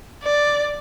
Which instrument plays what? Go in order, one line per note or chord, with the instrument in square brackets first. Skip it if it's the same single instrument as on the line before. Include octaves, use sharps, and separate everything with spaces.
[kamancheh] D5